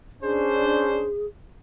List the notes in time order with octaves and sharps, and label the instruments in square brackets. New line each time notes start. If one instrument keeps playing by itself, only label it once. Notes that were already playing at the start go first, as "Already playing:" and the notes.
[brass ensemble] C#4 D4 C5 [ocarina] G#4